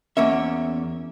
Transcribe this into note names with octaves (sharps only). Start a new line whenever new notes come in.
E2 A#3 C#4 E5